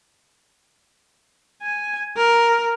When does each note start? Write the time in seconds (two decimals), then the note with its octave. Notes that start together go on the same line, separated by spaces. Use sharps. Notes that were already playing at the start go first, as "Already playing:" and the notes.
1.62 G#5
2.17 A#4